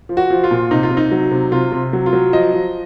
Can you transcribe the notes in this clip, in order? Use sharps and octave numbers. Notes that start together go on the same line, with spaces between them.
F3
F#4
F3
F4
A#2
C3 D#4
F4
C3
D#4
F#3
C3
C3 F4
C3
F#3
F4
F#3
F3 D#5
F3